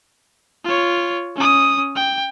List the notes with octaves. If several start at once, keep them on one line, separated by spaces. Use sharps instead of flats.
F4 C#5
C#4 D#6
G5